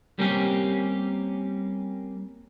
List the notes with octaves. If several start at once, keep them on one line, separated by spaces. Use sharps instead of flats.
G3 A#3 C4 C#4 G4